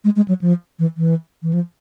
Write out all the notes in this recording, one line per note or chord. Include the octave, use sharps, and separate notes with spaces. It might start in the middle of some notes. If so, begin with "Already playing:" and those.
G#3
G#3
F#3
F3
E3
E3
E3
F3